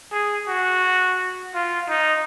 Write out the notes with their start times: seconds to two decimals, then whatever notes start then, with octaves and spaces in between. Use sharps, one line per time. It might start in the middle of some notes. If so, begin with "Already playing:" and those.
0.12 G#4
0.48 F#4
1.55 F4
1.89 D#4